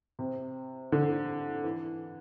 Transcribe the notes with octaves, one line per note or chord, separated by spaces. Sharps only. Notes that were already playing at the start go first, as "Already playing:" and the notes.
C3
D3
E3